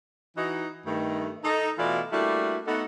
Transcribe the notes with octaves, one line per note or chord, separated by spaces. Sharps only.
E3 D#4 F#4
G2 D#3 A3
D#4 A4
B2 E3 A3 E4 F4 D5
G3 A3 A#3 D4 E4 F#4
A3 B3 D#4 F#4 A4 F#5